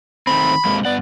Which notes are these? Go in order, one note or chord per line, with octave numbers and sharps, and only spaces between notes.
D#3 A3 C4 B5
C3 G#3 A#3
G2 B3 D5 F#5